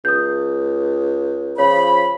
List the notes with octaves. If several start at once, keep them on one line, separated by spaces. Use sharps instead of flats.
C#2 D#6 G6
C#3 F3 C#5 B5